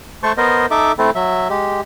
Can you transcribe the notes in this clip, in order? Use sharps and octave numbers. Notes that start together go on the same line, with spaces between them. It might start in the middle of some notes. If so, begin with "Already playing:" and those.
A3 C5 A5 C#6
B3 A#4 C5 D#5
D#4 A4 E5 D6
A3 C4 E4 A4
F#3 E5
G#3 G4